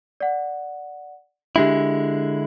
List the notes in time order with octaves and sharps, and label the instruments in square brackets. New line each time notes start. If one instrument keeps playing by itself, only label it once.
[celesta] D5 F#5
[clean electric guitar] D3 G#3 E4 [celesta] D4 G4 E5